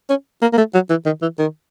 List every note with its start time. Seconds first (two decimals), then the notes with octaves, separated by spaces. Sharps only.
0.09 C#4
0.42 A#3
0.53 A#3
0.58 A3
0.74 F#3
0.90 E3
1.06 D#3
1.22 E3
1.39 D#3